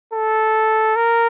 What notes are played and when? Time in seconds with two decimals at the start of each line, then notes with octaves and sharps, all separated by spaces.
0.14 A4
0.96 A#4